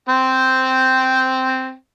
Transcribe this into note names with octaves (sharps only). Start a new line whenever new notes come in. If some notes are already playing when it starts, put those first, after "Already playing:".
C4 G5